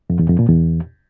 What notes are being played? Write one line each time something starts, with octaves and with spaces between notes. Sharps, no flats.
F2
E2
F2
A#2
E2